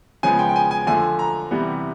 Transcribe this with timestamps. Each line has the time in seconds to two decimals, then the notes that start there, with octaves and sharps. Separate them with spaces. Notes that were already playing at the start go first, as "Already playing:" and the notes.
0.23 C#3 F3 G#3 B3 G#5
0.39 G5
0.49 G5
0.56 G#5
0.71 G#5
0.87 D3 F3 A3 G#5
1.19 A#5
1.51 C3 E3 G3 B3